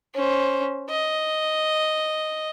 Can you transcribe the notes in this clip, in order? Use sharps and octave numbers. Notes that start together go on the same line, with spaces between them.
C#4 C5
D#5